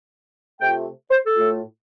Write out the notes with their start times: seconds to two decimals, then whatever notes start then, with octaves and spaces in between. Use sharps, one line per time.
0.61 C3 A3 F4 G5
1.11 C5
1.23 A4
1.36 A2 A3 F4